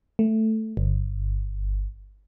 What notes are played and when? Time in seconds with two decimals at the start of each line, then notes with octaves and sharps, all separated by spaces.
0.19 A3
0.77 G1